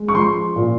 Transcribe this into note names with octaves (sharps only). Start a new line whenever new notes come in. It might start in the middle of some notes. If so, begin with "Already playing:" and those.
Already playing: G#3
C#6
F3 C6
A#2